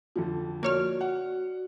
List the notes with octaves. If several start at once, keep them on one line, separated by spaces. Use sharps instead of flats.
F2 D3 F3
A#3 F#4 C#5 D5 F6
F#5